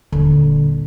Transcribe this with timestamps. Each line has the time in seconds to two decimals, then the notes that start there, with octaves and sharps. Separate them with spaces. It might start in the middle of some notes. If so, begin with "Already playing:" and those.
0.12 D#1 D3